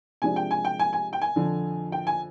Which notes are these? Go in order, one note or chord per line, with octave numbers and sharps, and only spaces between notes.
C3 F3 G#3 D4 G#5
G5
G#5
G5
G#5
G#5
G5
G#5
F2 D3 F3
G5
G#5